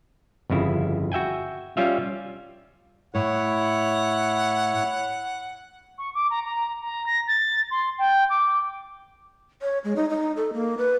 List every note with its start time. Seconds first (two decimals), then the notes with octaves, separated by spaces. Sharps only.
0.50 G1 F2 C#3 E4
1.12 F#4 E5 G5 G#5
1.77 G3 C#4 F4 E5 F5
3.15 A2 E4 C#5 F#5
5.98 C#6
6.15 D6
6.30 A#5
6.44 A#5
6.82 A#5
7.06 A#6
7.28 A6
7.71 C6
7.99 G5
8.30 D6
9.62 C#5
9.84 G#3
9.96 D#4
10.10 D#4
10.36 A4
10.53 A#3
10.78 B4